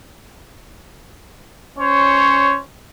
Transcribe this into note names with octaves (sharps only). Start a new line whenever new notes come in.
C#4 C5 C#5